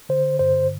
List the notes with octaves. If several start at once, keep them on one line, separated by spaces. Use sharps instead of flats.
D3 C5
G2 C5